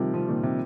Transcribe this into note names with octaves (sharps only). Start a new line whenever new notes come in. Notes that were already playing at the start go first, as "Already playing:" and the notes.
Already playing: C3 D#3 F3 G3
C3 F3
A#2 D#3
C3